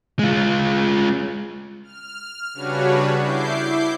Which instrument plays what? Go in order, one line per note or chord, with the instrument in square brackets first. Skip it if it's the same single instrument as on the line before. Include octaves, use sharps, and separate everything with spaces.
[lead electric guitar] G#3 F4
[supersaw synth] F6
C#3 G3 D4 F#4 B4 C#5
E4 D6 G6 C7